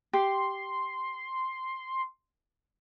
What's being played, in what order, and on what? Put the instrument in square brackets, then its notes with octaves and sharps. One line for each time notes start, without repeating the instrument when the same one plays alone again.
[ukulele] G4 [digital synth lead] C6